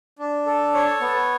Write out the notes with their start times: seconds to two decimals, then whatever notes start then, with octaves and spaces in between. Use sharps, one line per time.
0.19 D4
0.46 A4
0.74 C#5
1.01 B3